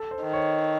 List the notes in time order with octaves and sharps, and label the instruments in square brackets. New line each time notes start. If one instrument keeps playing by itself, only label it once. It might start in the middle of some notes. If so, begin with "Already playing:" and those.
Already playing: [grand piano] A4
C5
[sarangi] D#3
[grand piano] C#5